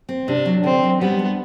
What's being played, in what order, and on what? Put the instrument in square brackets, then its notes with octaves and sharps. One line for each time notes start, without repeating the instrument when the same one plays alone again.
[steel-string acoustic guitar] C4
[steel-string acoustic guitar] C3 [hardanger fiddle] D4
[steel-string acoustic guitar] F#3
[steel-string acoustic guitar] D3 [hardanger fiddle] C4
[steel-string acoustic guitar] F#3
[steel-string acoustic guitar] G3 [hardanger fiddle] B3
[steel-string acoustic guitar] D4